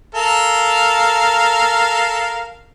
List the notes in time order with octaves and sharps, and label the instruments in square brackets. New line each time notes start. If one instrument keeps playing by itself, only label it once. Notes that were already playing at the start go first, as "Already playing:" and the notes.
[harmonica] A4 A#4 F5